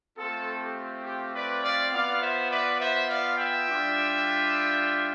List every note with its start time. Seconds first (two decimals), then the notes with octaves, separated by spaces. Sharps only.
0.18 A3 C4 F4 A4
0.62 G4
1.05 G4
1.35 B4 D5
1.64 D5 F5
1.92 B3 F4 D5 F5
2.21 C5 E5
2.51 B4 D5
2.80 C5 E5
3.08 D5 F5
3.37 E5 G5
3.67 G3 D4 F4